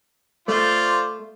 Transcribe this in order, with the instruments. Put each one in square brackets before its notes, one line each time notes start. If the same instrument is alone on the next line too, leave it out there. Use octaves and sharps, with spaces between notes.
[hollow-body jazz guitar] A3 [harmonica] F4 C5 D5